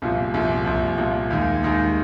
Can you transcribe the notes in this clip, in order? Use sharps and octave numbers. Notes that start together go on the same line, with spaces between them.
C2 A#2 F3
C2 A#2 F3
C2 A#2 F3
C2 A#2 F3
D#2 D#3 G#3
D#2 D#3 G#3